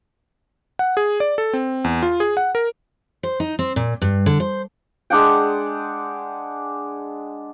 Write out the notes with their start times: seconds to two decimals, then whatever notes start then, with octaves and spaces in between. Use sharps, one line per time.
0.79 F#5
0.97 G#4
1.20 D5
1.38 A4
1.53 C4
1.84 E2
2.03 F4
2.20 G#4
2.37 F#5
2.55 A#4
3.23 C5
3.40 D#4
3.59 C4
3.76 A#2
4.02 G2
4.26 D3
4.40 C5
5.10 G#3 D4 F#5 G5